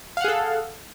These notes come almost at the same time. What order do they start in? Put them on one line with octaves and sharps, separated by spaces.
F5 F#5 G#4 A4